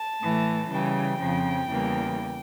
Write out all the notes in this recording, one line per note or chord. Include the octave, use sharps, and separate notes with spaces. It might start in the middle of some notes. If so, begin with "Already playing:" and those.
Already playing: A5
A2 E3 A3
C#3 E3 G3 G5
F2 C#3 F3
E2 C#3 E3 G3 A#3